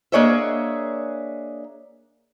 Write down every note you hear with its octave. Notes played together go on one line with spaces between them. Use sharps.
A#3 D4 G#4 C#5 D#5 E5